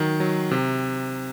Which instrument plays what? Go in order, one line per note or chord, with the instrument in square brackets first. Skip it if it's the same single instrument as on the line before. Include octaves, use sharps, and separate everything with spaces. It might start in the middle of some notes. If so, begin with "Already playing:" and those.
Already playing: [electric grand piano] D#3 F#3
F#3
C3